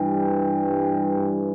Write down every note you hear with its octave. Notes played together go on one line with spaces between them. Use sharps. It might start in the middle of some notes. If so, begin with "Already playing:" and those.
Already playing: G2 E3 G3 G5